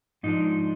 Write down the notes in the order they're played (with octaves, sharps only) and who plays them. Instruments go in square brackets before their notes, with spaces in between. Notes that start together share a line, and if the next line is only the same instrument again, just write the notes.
[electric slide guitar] G#2 F3 G#3 D4 D#4